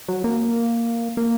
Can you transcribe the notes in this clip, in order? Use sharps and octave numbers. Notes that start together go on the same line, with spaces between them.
F#3
A#3
A#3